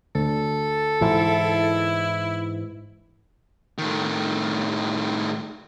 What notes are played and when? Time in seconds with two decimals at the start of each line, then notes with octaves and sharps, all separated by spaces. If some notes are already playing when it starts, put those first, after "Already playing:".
0.15 D2 A4
1.01 G#2 E3 E4
3.78 A2 D#3